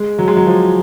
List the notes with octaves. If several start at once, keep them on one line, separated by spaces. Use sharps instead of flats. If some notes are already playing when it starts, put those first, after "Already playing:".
Already playing: G#3
F#3
G#3
F#3
F3